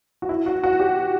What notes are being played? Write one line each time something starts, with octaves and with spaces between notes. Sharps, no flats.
F#4
E4
F#4
F#4
G4